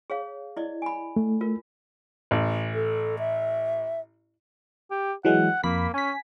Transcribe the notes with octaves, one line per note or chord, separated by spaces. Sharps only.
G#4 C#5 F5
E4 D5 D#5
G#5 B5
A3
F4 A#4
A1
A4
E5
G4
E3 F#3 G#3 F#5
F2 A#3 B5 B6
C#4 G#5 B6